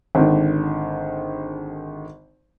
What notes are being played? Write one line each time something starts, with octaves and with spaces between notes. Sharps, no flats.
G#1 D3 D#3